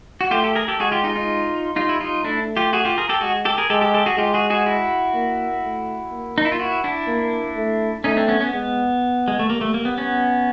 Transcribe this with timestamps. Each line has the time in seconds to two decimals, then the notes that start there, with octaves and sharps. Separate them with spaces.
0.21 F#4
0.31 A3 F4 G4
0.44 G4 A4
0.55 G#4 A#4
0.68 G4 A4
0.80 G#3 F#4 G#4
0.92 F4 G4
1.04 D#4 F4
1.16 D#4 F4
1.76 G3 D#4 F4
1.89 E4
2.00 D#4 F4
2.24 A3 D4 E4
2.57 F4 G4
2.73 F#4 G#4
2.85 F4 G4
2.98 G#4 A#4
3.09 G4 A4
3.21 G#3 F#4 G#4
3.45 G4 A4
3.58 G#4 A#4
3.70 G#3 G4 A4
3.81 G4 A4
3.94 G4 A4
4.06 F#4 G#4
4.18 G#3 F4 G4
4.34 F#4 G#4
4.50 F#4 G#4
4.66 E4 F#4
5.15 A#3
5.63 A3
6.11 A#3
6.38 D#4
6.45 E4
6.52 F4
6.59 E4 F#4
6.84 D4 E4
7.08 A#3
7.56 A3
8.04 A3 C#4 D#4
8.17 C4 D4
8.28 B3 C#4
8.40 B3 C#4
8.53 G#3 B3
9.28 G#3
9.39 A3
9.49 G3 A#3
9.61 A3
9.74 A#3
9.85 B3
9.98 B3 C#4